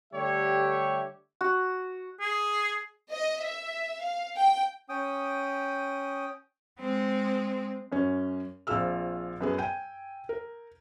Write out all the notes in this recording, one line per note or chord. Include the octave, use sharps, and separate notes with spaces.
D3 G3 A3 G4 C#5 E5
F#4
G#4
D#5
E5
F5
G5
C#4 G5 D#6
G#3 C4
F#2 C#4
A#1 C4 F4 G#4 E6 F6
F#2 B3 G#4
G5 G#5 G6 D#7
A#4